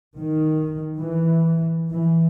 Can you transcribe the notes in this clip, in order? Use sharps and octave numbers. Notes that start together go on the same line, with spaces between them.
D#3
E3
E3